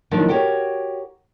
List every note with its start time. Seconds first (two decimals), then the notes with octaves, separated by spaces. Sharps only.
0.11 D#3 F3 F#3 A#3 D4 D#4
0.29 F#4 G4 A#4 C#5